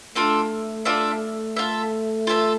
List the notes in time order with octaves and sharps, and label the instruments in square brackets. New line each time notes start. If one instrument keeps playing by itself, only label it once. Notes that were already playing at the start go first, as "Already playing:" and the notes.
[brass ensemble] A3 [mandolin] D4 F4 A4 E5
[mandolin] D4 F4 A4 E5
F4 A4 E5
F4 A4 E5